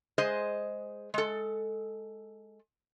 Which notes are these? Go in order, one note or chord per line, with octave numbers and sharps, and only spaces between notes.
G#3 G#4 C5 D#5
G#3 A4